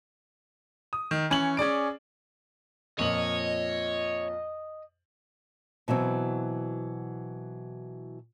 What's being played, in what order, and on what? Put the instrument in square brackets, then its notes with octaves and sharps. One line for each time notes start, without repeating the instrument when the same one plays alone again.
[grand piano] D#6
D#3
E3 C#4 C#6 F#7
C#4 G#4 D5 D7
[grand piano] F2 A#2 F#7 [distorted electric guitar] C#5 [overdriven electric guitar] D#5
[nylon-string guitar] B2 E3 F#3 C4